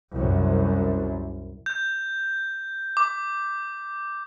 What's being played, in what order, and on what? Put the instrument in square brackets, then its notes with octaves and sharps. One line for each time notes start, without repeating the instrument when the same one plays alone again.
[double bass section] C2 F#2
[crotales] G6
D6